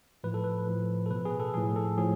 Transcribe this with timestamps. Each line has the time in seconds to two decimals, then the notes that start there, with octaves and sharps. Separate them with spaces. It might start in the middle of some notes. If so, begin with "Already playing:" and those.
0.24 A2 F3 B4
0.34 A4
0.44 B4
0.67 A2 F3
1.06 A4
1.11 B2 B4
1.25 G#4
1.40 A4
1.54 A2 F3 G#4
1.76 A4
1.98 A2 F3 G#4